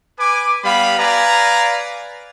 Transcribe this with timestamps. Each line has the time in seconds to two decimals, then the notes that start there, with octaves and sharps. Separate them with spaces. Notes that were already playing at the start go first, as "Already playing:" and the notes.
0.19 B4 G#5 D6
0.64 G3 B3 F5 B5
0.98 B4 D5 F5 G#5 A#5